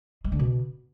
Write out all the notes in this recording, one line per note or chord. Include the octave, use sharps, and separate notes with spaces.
G#3
D3
B2